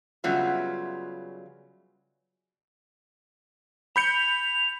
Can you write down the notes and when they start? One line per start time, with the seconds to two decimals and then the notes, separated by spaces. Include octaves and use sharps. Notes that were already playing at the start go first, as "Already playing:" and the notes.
0.24 C#3 F#3 G3 B3 F4 E5
3.96 B5 G6 C#7 F7